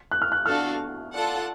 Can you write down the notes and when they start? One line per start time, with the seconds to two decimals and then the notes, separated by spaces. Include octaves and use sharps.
0.11 F#6
0.22 F6
0.32 F#6
0.46 D4 F#4 A4 F5 F6
1.14 F4 A4 D5 F#5 A5